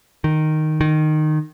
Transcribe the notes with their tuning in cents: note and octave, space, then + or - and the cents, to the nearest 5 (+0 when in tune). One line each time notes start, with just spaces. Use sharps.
D#3 -5
D#3 -15